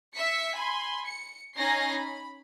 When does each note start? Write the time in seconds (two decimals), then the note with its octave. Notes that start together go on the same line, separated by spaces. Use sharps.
0.15 E5 B6 C#7
0.55 G#5 B5 C6
1.06 C#7
1.57 C#4 D#4 G#5 A#6 C7
1.92 B5